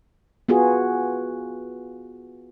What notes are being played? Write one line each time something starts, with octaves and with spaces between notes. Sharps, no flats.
B3 F4 F#4 G#4